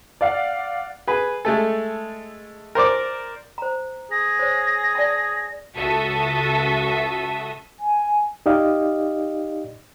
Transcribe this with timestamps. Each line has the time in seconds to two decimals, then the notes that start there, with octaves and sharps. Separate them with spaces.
0.21 D5 F5 F#5
1.07 G#4 B4
1.45 G#3 A3 A4
2.75 A#4 C5 D5 D6
3.58 C5 A#5
4.11 G#4 A#6
4.39 C5 C#5
4.95 D5 G#5 A5
5.77 C#2 F#4 A4 E5 D#6
7.80 G#5
8.46 D#4 G4 D5 D#5 F5